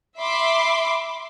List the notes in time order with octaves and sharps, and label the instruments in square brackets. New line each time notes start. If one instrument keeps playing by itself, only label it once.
[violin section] E5 B5 C6 D6